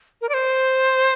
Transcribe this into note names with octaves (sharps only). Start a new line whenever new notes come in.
A#4
D5
C5